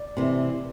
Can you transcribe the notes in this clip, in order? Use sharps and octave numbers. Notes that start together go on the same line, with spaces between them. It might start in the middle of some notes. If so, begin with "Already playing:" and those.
Already playing: D5
C3 E3